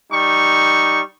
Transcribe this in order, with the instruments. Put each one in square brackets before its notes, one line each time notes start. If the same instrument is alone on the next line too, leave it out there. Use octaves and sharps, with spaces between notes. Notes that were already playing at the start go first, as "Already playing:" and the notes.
[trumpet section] G3 D#4 C#6